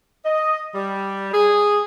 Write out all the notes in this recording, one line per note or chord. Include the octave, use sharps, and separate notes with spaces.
D#5
G3
G#4